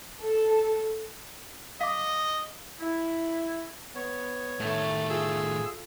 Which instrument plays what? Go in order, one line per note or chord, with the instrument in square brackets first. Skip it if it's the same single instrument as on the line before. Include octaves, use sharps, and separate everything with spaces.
[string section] A4
[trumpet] D#5 [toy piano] F5 D6
[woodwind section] E4
[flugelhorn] B3 [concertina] C#5
[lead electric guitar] A2 D#3 [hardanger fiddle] A3
[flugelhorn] F4 [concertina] G#4 E6